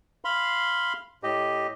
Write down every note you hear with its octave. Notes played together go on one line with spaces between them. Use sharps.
F5 B5 C6
A2 G4 D#5